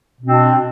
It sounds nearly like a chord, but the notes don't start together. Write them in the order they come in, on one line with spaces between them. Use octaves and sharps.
B2 C4 D4